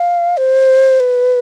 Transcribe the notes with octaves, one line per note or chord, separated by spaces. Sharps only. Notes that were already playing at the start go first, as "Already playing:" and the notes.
Already playing: F5
C5
B4